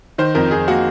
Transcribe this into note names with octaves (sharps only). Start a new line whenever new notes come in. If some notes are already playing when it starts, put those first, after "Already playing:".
D#3 C5
F2 A#4
F2 G#4
A#3 F#4